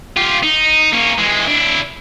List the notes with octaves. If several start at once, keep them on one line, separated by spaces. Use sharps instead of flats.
F4 G4
D#4
A#3 C#4
E3 G#3
D4 E4